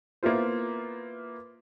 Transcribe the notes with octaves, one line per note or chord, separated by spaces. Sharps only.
A#3 B3 E4 F4 C5